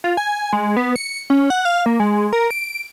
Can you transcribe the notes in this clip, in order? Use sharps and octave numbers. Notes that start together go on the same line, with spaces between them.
F4
G#5
G#3
B3
C#7
C#4
F#5
F5
A#3
G#3
A#4
D7